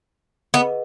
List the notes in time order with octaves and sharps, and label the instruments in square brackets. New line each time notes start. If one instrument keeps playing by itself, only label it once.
[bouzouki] B3 [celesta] G#4 B4 D#5